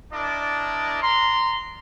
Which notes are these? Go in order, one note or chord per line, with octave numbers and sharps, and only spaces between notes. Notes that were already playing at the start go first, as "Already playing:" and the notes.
D4 E4 A#4 D5 D#5
A#5 C6